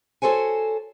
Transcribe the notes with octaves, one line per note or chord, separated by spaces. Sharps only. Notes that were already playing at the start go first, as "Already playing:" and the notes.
F#4 G4 A4 C5 C#5 G#5